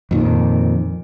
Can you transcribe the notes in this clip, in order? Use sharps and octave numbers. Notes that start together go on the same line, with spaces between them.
F2 A#2 D#3